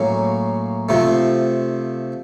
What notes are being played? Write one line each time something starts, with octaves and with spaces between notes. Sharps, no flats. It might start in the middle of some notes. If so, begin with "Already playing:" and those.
Already playing: A2 F#3 A#3 C#4
C3 F3 A3